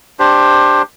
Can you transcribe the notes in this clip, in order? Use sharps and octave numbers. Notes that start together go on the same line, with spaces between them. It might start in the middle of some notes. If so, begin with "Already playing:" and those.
D4 G4 C5